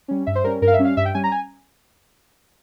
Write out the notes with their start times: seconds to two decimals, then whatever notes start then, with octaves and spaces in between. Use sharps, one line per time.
0.08 G3 C#4
0.27 G2 E5
0.35 C5
0.44 G3 C#4 A#4
0.62 G2 A#4
0.67 F5
0.73 E5
0.78 G3 C#4
0.85 F5
0.97 G2 E5
1.05 G5
1.14 G3 C#4 G#5
1.24 A#5
1.32 G#5